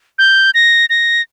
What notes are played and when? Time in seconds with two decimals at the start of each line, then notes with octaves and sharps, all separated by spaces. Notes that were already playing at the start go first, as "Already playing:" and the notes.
0.19 G6
0.54 A#6
0.90 A#6